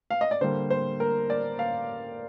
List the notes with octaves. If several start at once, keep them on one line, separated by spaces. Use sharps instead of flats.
F5
D#5
D5
D3 G3 A#3 C5
C5
A#4
D5
F5